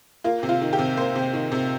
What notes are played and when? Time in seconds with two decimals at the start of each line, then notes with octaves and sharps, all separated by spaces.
0.24 A#3 F4
0.43 C3
0.49 F4
0.61 D#3
0.73 G4
0.79 C3
0.97 A#3 C5
1.16 C3
1.33 D#3
1.52 C3